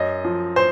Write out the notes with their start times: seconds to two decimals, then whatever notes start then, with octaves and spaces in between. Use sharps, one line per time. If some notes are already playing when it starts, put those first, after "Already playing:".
Already playing: F#2 D#5
0.24 F3
0.56 C5